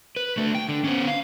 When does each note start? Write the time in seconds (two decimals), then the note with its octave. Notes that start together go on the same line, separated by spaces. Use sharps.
0.16 B4
0.37 D3 A3
0.55 G5
0.69 D3
0.84 B3 C#4
1.08 F5